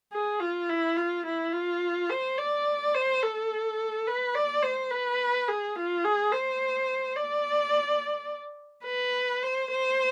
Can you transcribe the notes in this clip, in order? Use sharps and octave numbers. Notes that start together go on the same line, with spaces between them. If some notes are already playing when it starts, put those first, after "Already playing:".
G#4
F4
E4
F4
E4
F4
C5
D5
C5
A4
B4
D5
C5
B4
G#4
F4
G#4
C5
D5
B4
C5
C5